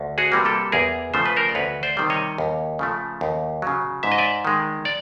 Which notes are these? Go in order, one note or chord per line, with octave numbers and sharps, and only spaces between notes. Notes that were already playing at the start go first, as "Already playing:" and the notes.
Already playing: D2
F#4 G#4
C3 E3 G3 A#3
G4 A4
E2 G#4 A#4
C#3 F3 A3 C5
B4
A#4 C5
D5
D2 B4 C#5
C5 D5
C3 D#3 G3
C#5 D#5
D#2
C#3 F3 A3
D#2
C#3 F#3
G#2 E5
D#5
D5 E5
D#3 G#3
D5